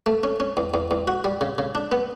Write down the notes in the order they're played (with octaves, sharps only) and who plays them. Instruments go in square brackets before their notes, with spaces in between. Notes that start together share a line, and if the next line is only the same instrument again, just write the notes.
[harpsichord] A3
C#4
C#4
E2
E2
E2
F#4
G3
C#3
C#3
D4
B3